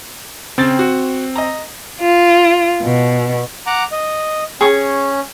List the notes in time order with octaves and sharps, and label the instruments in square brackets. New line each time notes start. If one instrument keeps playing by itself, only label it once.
[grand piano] C#3 G5 A6 [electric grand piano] C4
[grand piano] F#4
D#5 A#5
[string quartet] F4
B2
[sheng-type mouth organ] F#5 A#5 D6
D#5
[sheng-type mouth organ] C#4 [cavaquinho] G#4 C#6